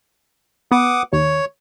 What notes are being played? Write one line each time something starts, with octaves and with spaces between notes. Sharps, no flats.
B3 F#5 D6 D#6
D#2 C#5